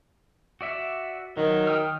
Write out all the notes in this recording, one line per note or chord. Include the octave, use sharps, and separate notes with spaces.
F#4 D5 E5
D#3 F#3
G5 D#6 F6